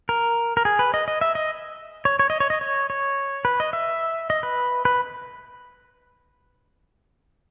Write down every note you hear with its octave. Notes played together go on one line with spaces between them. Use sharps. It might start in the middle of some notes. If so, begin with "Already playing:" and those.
A#4
A#4
G#4
B4
D#5
D#5
E5
D#5
C#5
C#5
D#5
C#5
D#5
C#5
C#5
B4
D#5
E5
D#5
B4
B4